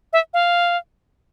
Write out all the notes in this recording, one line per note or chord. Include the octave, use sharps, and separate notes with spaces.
E5
F5